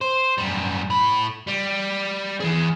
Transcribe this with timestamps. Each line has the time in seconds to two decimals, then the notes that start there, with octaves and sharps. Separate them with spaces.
0.01 C5
0.38 F#2 G3
0.90 A2 B5
1.47 G3
2.40 E3 G#4